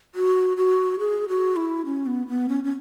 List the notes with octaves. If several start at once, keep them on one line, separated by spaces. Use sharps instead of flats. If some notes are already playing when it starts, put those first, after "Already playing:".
F#4
F#4
G#4
F#4
E4
C#4
B3
B3
C#4
C#4